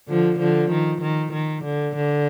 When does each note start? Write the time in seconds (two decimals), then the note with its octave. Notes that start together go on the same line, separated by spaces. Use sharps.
0.09 D3 F3
0.39 D3 F3
0.71 D#3
1.02 D#3
1.33 D#3
1.65 D3
1.96 D3